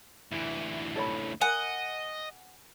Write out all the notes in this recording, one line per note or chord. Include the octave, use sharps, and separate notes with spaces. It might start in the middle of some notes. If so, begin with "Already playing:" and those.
D2 E3 E4
A4 C#5 B5
A#4 D#5 F#5 G#5